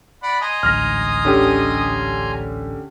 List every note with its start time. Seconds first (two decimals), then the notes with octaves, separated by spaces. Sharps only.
0.23 D5 F#5 B5
0.41 D#5 G#5 A#5 C6 D#6
0.63 A1 D2 G#2 F6 A#6
1.25 D3 C#4 G4